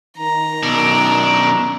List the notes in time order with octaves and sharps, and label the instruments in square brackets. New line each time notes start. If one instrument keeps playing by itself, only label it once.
[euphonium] D#3 [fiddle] A#5
[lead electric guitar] F#2 B2 [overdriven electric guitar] D4